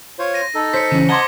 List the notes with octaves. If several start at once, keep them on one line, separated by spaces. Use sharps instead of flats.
F4 C5 C#5
A#6 D#7
D#4 A4
C5 B6 C#7
C#3 E3 C#4
D#5 F#5 A5 A#5 C6 D6 G#6 G7